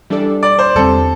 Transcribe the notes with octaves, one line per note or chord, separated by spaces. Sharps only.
E3 G3 D4 A4 D5
D5
C5
E2 D3 G3 C4 A4